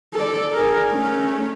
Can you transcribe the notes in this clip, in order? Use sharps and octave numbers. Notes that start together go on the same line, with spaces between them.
A4 D5
G#4 A#4
A3 C#4